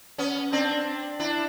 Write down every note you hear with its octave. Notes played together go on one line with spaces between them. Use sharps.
B3 C#4
C4 D4
D4 E4